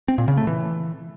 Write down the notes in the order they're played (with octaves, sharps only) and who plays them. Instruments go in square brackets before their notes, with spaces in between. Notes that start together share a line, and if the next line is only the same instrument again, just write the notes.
[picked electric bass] C4
A#2
C#3
A3
E3